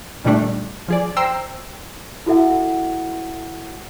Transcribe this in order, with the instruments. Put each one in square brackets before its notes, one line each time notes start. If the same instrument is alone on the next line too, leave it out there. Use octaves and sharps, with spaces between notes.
[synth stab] A#2 D3 D#3 G3 A3 D4
F3 G#4 D5
C5 G5 A#5 E6 C7
[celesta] E4 F#4 A4 E5 F#5